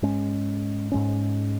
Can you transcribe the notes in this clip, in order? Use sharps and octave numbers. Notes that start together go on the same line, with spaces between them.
G#2 G#3 C#4
G#2 G#3 C#4